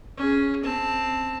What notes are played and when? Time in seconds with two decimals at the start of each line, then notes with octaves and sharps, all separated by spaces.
0.17 C#4 G#4
0.63 C4 A5